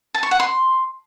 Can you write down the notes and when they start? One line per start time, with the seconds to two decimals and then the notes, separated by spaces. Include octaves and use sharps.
0.14 A5
0.23 C#6
0.31 F#5
0.40 C6